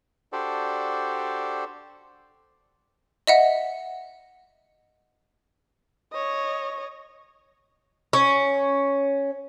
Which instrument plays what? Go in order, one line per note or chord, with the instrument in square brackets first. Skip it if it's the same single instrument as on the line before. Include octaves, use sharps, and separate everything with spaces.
[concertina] D4 F#4 G4 A4 C5 D5
[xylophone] D#5 E5 F#5
[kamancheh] C#5 D#5
[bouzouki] C#4